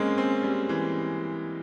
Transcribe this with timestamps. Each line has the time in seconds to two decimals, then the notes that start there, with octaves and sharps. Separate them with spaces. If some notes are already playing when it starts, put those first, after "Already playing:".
Already playing: G#3 A#3 C4 C#4
0.18 C4
0.44 G3
0.69 E3